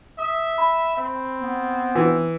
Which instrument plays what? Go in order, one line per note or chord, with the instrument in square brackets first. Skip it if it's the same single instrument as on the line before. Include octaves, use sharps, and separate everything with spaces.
[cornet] E5 [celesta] D#6
[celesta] B5
[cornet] C4
[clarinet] B3
[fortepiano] E3